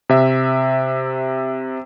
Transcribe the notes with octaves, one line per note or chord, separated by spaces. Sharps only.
C3 E5